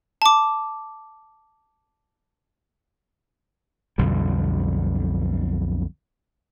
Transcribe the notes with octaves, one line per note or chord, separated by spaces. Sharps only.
A5 D6
B1 F2 D3 G3